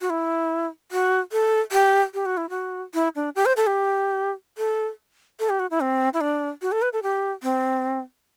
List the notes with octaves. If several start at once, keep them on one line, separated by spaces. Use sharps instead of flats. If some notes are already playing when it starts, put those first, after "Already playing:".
F#4
E4
F#4
A4
G4
G4
F#4
E4
F#4
E4
D4
G4
C5
A4
G4
A4
A4
G4
F#4
E4
C4
E4
D4
F#4
A4
B4
A4
G4
C4